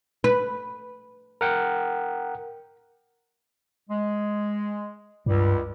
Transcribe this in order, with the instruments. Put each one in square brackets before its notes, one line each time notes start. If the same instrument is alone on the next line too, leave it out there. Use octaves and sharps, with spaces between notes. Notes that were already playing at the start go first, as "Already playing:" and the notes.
[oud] B4
[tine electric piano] A#4 F#5 G5
[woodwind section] G#3
[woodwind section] C#2 G3 [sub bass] G2